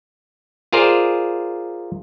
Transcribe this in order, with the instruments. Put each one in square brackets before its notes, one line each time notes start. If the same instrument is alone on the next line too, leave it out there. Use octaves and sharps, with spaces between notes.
[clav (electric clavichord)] F4 G#4 A#4 C5 D5